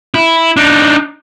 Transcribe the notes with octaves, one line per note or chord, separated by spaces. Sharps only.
E4
D4 D#4